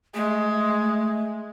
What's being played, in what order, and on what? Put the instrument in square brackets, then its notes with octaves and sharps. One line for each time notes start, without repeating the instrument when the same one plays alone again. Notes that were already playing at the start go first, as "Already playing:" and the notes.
[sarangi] G#3 [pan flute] A3